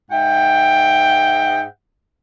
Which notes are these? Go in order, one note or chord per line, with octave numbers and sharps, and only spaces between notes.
G#2 E5 F#5 G5